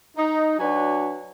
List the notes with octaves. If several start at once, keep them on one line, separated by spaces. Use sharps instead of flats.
D#4
F#3 D4 F#4 B4 C#5 G#5